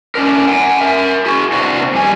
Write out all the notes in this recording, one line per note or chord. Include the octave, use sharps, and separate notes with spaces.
A3 C#4 D4 A#4
F#5 G#5
A#4 E5
F#4 G#4
C3 B3 C4 D4 F#4
F2 G3 G#5